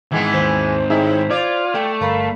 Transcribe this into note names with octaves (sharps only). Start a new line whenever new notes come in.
G#2 D#3 E3 G#3 B3
D#2 C5
A2 D#4 E4 G#4 E5
F4 D5 G#6
A3 G5
G1 A#4 F5 B5